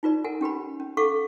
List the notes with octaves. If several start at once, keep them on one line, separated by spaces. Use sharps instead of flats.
D#4 F4 B4 D5
A#4 F#5 G#5
C#4 G4 B4 B5
C#4
A4 F5 F#5 C#6 D6